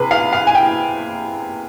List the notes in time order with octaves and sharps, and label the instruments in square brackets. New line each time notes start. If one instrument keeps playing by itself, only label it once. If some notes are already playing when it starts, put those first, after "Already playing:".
Already playing: [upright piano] C3 G#4 B4
F5
F5
G#5
G5